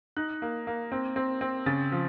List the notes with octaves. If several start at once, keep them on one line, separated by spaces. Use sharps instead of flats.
D#4 F#6
A#3
A#3
C4
C4
C4
C#3 A6
F3